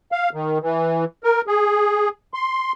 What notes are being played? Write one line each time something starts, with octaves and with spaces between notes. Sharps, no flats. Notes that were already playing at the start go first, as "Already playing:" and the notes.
F5
D#3
E3
A#4
G#4
C6